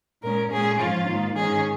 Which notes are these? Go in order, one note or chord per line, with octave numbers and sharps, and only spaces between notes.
A#2 G#3 C#4 A#4
A#2 G#3 C#4 G#4
G#2 F3 C#4 F4
G#2 D#3 A#3
G#2 D#3 C#4 G#4